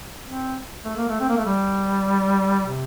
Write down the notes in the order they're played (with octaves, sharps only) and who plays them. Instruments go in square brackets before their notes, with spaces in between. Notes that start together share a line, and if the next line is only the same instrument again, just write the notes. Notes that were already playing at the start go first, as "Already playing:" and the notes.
[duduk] C4
A3
A#3
A3
C4
A#3
A3
G3
C3